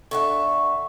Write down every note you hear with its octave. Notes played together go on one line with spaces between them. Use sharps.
D3 E5 F#5 C#6